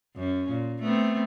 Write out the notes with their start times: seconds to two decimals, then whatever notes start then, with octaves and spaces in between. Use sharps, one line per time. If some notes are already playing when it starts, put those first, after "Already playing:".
0.16 F#2 C#4
0.49 A#2
0.82 A3 B3 C4